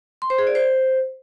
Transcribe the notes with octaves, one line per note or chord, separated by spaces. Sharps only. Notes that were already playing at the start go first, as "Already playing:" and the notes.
C6
C5
G#4
D5
C5